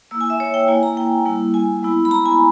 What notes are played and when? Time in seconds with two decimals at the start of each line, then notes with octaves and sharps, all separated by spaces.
0.11 A#3 E4 E6
0.21 G#5
0.30 E5
0.40 C#5
0.54 G5
0.68 A#3 E4 G#5
0.83 A#5
0.97 G5
1.25 G3 A#3 E4
1.54 G#5
1.83 G#3 B3 E4
2.05 B5
2.11 A#5
2.26 G#5